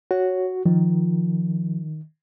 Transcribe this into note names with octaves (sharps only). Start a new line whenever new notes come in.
F#4 C#5
D#3 F3